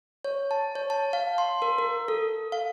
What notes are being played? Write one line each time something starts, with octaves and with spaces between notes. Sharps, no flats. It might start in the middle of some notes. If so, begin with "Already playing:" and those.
C#5
A5
C#5
A5
F5
C6
A#4
A#4
A4
F5